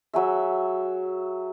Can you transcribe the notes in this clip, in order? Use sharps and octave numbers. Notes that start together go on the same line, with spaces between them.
F#3 G#4 E5